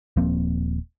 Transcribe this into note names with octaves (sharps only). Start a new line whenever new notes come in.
D#1 F3 A#3 C4